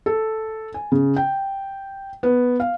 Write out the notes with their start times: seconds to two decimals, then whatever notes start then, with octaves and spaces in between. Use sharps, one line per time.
0.06 A4
0.74 G#5
0.92 C#3
1.17 G5
2.23 B3
2.60 F5